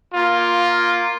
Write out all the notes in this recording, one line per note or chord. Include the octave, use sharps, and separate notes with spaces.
A#3 F4